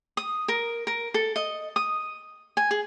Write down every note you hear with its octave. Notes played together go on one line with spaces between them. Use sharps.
D#6
A#4
A#4
A4
D#5
D#6
G#5
G#4